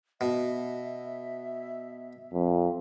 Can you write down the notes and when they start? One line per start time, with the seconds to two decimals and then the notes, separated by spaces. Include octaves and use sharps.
0.21 B2 E5
2.33 F2